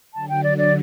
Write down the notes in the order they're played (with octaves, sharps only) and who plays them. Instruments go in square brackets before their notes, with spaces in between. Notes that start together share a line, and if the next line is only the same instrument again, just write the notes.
[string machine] D3 F#3 [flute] A5
[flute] G5
D5
D5